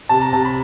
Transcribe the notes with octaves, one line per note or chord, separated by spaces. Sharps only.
C3 A5
A#5
C3 A5
B5